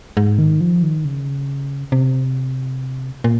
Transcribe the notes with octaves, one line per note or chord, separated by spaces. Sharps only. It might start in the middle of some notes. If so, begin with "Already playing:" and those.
G#2
D#3
F3
D#3
C#3
C3
A#2